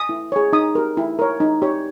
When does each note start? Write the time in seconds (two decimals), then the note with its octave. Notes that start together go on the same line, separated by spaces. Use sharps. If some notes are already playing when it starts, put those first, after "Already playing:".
Already playing: D#6
0.09 E4
0.32 G#4 C#5
0.53 D#4 D#6
0.75 G4 A#4
0.97 E4
1.19 A#4 C#5
1.40 D#4
1.62 G4 C#5